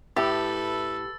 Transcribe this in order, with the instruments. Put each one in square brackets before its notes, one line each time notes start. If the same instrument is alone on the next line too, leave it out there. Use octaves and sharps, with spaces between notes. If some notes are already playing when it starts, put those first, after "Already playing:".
[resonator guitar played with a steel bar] A2 E4 [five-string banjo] G4 [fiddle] A4 B4 [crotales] E6 A6